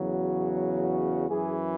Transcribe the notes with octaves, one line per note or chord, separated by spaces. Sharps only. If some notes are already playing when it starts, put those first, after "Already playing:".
Already playing: E2 C#3 F#3
F#4
F#2 E3 G#4